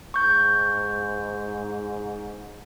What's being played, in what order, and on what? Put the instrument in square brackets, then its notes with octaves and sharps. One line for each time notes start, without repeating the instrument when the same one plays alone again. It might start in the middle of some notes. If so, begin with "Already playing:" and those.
[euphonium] G#2 [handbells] C#6 G6